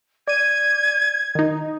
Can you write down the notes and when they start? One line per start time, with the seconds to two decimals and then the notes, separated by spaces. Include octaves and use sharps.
0.28 D5 G#6 D#7
1.35 D#3 D#4